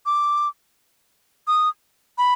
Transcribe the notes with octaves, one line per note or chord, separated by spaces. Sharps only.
D6
D#6
B5